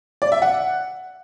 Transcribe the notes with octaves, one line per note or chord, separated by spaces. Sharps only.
D5
E5
F#5